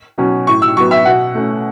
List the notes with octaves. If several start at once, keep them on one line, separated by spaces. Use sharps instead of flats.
B2 F#3 C#4
A2 C#6
E6
F#3 B3 C#6
E5
B2 F#5
A3 C#4